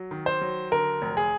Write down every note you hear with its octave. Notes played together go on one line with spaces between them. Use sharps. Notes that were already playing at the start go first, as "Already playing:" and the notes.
Already playing: F#3
D#3
C5
F#3
D3 A#4
F1
G#4